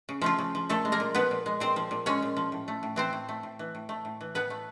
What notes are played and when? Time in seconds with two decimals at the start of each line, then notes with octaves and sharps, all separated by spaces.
0.09 C#3
0.22 F3 A3 F4
0.39 C#3
0.55 F3
0.69 A#2 A3 A4
0.85 G#3
0.92 A#3 A#4
1.00 A#2
1.15 F3 B3 B4
1.31 A#2
1.46 G#3
1.60 A#2 C4 C5
1.76 F3
1.91 A#2
2.06 G#3 C#4 C#5
2.22 A#2
2.37 F3
2.52 A2
2.68 A3
2.83 A2
2.96 E3 C4 C5
3.13 A2
3.29 A3
3.43 A2
3.59 E3
3.75 A2
3.89 A3
4.05 A2
4.21 E3
4.35 A2 B3 B4
4.50 A3